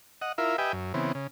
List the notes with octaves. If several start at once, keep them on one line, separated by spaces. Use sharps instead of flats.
D#5 F#5
E4 F4 A#4 E5
G4 B4 D#5 E5 G5 G#5
F#2
C#3 E3 B3 C4
C#3